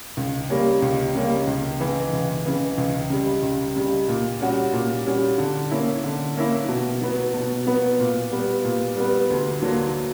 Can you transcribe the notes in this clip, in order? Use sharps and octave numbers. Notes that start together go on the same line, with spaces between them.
C#2
C#3 G3 A#3 C#4
C#2
C#3 G3 A#3 C#4
C#2
C#3 E3
C#2
C#3 E3
C#2
C#3 G3
C#2
C#3 G3
A#2
G3 C#4 F#4
A#2
G3 C#4 F#4
D3
A#3 C#4 E4
D3
A#3 C#4 E4
B2
F#3 B3
B2
F#3 B3
A#2
G3 B3
A#2
G3 B3
D2
D3 F#3 A#3